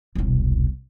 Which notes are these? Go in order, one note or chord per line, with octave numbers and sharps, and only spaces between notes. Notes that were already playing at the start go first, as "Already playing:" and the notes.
E1 C2